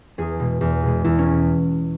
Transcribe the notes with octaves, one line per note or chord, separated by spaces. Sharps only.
E2 G#4
B2 G#3
E2
B2 G#3
E2 E4
C#4